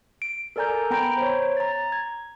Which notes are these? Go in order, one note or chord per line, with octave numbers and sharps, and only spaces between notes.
D7
A4 A#4 D5 G#5 A#5 G6
B3 G5 A#5 B5 G6 D7
C5 C#5
A#5 A6
G#6